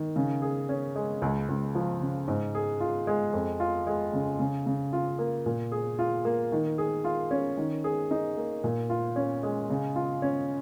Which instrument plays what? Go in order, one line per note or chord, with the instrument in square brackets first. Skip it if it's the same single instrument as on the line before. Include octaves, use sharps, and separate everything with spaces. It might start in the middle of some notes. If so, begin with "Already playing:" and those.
Already playing: [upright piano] D#3
C#3
G#4
C#4
G#3
C#2
C#2
F3
C#3
G#2
G#4
F4
G#3
F2
F4
G#3
C#3
C#3
C#3
F4
A#3
A#2
G#4
F4
A#3
D#3
G#4
F4
C#4
D#3
G#4
D#4
A#3
A#2
F4
C#4
G#3
C#3
F4
C#4